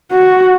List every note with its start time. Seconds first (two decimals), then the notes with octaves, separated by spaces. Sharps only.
0.12 F#4